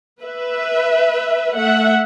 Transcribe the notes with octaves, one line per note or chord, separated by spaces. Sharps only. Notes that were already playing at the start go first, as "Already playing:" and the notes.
B4 E5
A3 E5 F#5